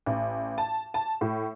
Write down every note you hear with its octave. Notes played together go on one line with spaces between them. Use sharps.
A1
A5
A5
A2